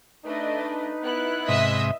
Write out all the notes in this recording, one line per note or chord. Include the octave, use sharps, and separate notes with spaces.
A3 D4 D#4 B4 D#5
B3 E4 F#6
G#2 C3 D#5 E5 D#6